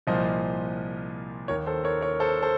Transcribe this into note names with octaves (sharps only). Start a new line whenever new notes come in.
C2 A#2 F3 C5 D#5
D#2 D#3 A#4 C#5
A4 C5
A#4 C#5
A#4 C#5
A4 C5
A4 C5